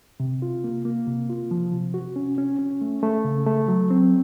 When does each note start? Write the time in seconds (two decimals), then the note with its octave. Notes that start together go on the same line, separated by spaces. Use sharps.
0.20 C3
0.42 F4
0.64 A#3
0.85 A#3
1.07 C3
1.30 F4
1.51 F3
1.72 C3
1.94 F#4
2.16 C#4
2.38 C#4
2.59 C#4
2.81 A3
3.03 A3
3.25 C#3
3.46 A3
3.68 F#3
3.90 C4